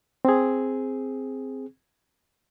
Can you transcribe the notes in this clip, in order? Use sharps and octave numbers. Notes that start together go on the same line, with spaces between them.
C4 G#4